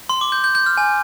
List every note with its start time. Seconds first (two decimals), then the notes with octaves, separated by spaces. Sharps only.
0.09 C6
0.21 D6
0.32 G6
0.44 G6
0.55 G6
0.66 F6
0.77 G#5